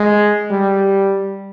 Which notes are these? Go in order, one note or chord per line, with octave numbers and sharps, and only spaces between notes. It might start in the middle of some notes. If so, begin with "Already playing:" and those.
Already playing: G#3
G3